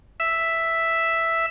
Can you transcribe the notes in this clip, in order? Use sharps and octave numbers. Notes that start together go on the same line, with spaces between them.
E5